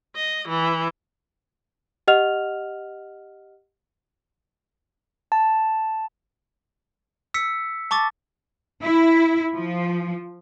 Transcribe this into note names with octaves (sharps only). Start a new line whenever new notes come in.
D#5
E3
G4 D#5 F#5 F6 F7
A5
E6 B6 C#7
A5 C#6 D6 A6
E4
F3